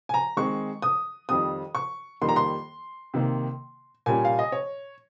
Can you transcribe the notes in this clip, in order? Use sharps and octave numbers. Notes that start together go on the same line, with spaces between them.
G#5
A#5
D#3 G#3 C4 C#6
D#6
F2 D#3 G3 C4 D#6
C#6
F2 D#3 G3 A#3 C6
A#5
C6
C3 D#3 A#3
A#2 G3 C#4 G#5
F5
D#5
C#5